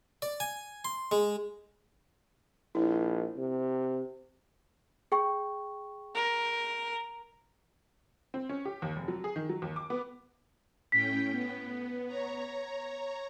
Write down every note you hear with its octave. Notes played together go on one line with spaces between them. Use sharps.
D5
G#5
C6
G#3
A#1 E4
C3
G#4 G5 C#6
A#4
C4
C#4
G4
D#2
F1
F#3
G#4
D#3
F#3
D#2
D6
B3
A2 C#4 G5 B6
B3
C#5 A#5